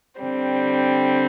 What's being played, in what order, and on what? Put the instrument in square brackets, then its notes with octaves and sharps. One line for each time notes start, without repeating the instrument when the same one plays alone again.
[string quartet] D3 G3 C4